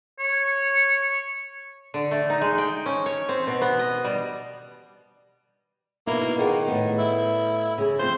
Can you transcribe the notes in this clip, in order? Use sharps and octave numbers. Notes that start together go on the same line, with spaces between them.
C#5
D3
A3
D#4
G#3
G5
C#4
C#5
C4
B2
B3
D#5
G3
B2 A#3 D#4 E4
D#3 F4 G#4 F#5
A2 B3
E4
C#3 G#4
F3 C4 C5